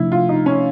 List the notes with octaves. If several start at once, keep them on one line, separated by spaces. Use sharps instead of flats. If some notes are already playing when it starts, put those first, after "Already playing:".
Already playing: C3 F3 A3 D4 E4
F4
D#4
C#4